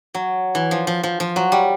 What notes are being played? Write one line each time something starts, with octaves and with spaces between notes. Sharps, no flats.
F#3
E3
F3
F3
F3
F3
F#3
G3